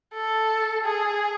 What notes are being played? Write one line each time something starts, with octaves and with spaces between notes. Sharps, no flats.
A4
G#4